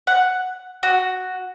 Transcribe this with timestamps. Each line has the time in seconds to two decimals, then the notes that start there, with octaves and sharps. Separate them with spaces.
0.07 F#5
0.83 F#4